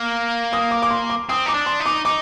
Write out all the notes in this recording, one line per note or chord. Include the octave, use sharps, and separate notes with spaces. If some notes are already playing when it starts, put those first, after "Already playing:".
Already playing: A#3
D#6
D6
D6
C6
D6
C4 D#6
D#4 D6
D4
C6
D#4
D6
D#4 D6